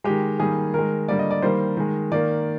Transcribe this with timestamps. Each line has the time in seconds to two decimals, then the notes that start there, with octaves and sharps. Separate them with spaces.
0.04 D#3 G#3 G4
0.40 D#3 G3 A#3 G#4
0.74 D#3 G#3 A#4
1.08 D3 G3 A#3 D5
1.19 D#5
1.31 D5
1.42 D#3 G3 A#3 C5
1.77 D#3 G#3
2.12 D#3 A#3 D5